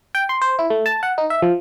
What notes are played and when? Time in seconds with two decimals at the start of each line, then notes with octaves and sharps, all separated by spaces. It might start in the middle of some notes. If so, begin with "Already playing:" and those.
0.15 G5
0.29 C6
0.42 C5
0.59 E4
0.70 A3
0.86 A5
1.03 F#5
1.18 D#4
1.30 E5
1.42 F3